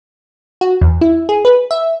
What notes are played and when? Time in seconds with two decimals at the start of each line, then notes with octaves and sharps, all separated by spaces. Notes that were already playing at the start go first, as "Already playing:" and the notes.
0.61 F#4
0.81 E2
1.01 E4
1.29 G#4
1.45 B4
1.71 E5